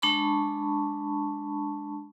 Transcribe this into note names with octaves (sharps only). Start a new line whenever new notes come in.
G#3 D4 A5 B5 C#6